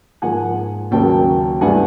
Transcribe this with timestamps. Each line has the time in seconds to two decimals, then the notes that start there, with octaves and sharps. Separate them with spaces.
0.22 G#2 F3 A#3 F#5 G#5
0.91 D#2 C#3 F#3 A#3 G5 A5
1.61 G2 E3 A3 D4 F#5 G#5